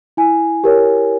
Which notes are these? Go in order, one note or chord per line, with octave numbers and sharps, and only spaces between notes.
E4 G#5
G4 A#4 C#5